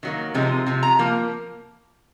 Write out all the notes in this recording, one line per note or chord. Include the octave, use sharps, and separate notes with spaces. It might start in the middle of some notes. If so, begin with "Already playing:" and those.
D#3 F#3 A#3
C3 F3 G#3 C4 D#4
C3 F3
A#5
F3 A#3